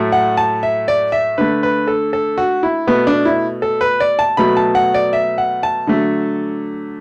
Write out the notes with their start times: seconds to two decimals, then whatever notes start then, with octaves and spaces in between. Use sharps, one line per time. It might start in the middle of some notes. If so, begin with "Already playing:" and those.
Already playing: A2 F#3 A3
0.12 F#5
0.37 A5
0.63 E5
0.88 D5
1.12 E5
1.38 D3 A3 B4
1.63 B4
1.87 A4
2.13 A4
2.38 F#4
2.63 E4
2.87 B2 A3 B3
3.07 D4
3.25 E4
3.62 A4
3.81 B4
4.00 D5
4.19 A5
4.37 B2 F#3 A3 B5
4.57 A5
4.75 F#5
4.94 D5
5.13 E5
5.38 F#5
5.63 A5
5.87 D3 F#3 A3